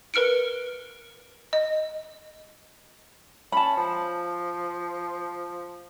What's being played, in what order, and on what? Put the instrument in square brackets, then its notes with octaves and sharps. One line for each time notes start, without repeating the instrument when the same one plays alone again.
[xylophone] A#4 B4 F6 C#7 D7
D#5
[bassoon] C#4 [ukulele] A5 B5
[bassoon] F3